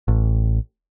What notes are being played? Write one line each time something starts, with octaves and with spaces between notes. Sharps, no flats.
A1